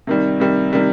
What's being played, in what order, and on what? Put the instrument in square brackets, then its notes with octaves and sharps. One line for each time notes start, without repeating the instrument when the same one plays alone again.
[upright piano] C3 D#3 G3
C3 D#3 G3
C3 D#3 G3